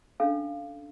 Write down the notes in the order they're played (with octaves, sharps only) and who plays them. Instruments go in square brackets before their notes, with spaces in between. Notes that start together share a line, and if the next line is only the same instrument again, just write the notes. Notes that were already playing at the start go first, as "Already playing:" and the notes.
[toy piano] C#4 D4 A4 F5